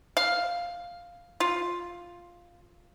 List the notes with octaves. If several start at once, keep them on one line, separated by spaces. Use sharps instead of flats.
F5
F4